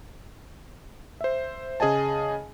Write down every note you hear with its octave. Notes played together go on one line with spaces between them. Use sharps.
C5 E5
C#3 G#4 D#5 G#5 A5